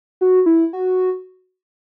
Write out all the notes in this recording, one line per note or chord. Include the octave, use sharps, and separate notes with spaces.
F#4
E4
F#4